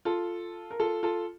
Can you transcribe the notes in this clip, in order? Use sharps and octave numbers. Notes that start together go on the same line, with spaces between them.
F4 A4
A#4
F4 A4
F4 A4